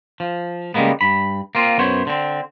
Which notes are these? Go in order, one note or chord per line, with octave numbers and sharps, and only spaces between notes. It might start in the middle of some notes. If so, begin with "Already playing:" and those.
F3
C#3 G3 G#3 A#3 B3
G2 B5
A#3 C4 F4
F#2 B3 C5 C#5
D3 C4